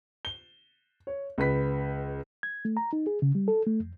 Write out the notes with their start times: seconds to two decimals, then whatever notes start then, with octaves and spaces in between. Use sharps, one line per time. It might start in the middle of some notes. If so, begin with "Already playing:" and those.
0.25 G7
1.07 C#5
1.38 C#2 B4 B6
2.43 G#6
2.65 A3
2.77 A#5
2.93 D#4
3.07 G#4
3.22 C#3
3.35 G3
3.48 A4
3.67 A3
3.80 F2